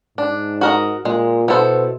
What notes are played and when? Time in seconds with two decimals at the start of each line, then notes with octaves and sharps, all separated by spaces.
0.17 G#2 D4
0.61 F#4 A#4 D#5
1.05 A#2 G#3
1.48 B2 B3 E4 A4 C5